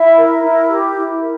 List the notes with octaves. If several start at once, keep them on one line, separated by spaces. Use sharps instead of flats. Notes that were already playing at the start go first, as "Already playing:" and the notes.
Already playing: E4 E5
A#4
E4
G4
E4
A#4